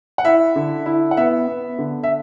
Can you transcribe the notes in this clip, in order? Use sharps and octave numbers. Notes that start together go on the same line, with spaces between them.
F#5
E4 E5
D3
E4
F#5
B3 E5
B3
D3
E5